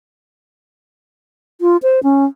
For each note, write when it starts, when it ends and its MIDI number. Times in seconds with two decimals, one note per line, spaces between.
1.61 1.77 65
1.83 2.00 72
2.03 2.25 61